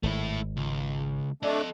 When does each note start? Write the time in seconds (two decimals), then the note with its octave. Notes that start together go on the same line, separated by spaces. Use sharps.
0.03 G#1 A3 E4
0.57 C#2
1.43 A3 D4 A4 D#5